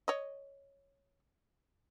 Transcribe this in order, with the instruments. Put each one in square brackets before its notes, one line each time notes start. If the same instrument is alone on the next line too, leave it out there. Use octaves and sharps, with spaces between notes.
[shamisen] C#5 D#5